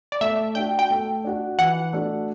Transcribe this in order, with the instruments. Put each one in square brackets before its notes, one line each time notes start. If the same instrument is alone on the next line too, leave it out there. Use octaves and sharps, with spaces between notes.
[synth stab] D5
[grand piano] A3 [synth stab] E5
[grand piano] D4 F#4 [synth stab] G5
[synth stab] G5
[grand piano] A3
D4 F#4
[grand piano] E3 [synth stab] F#5
[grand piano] A3 D4 F#4